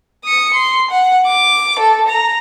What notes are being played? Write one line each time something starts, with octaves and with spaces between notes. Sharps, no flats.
D#6 C#7
C6
F#5
D6
A4
A#5